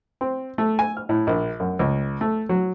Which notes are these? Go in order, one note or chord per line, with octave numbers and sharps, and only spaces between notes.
C4
A3
G#5
F6
A2
A#1
F#2
C#2
A3
F#3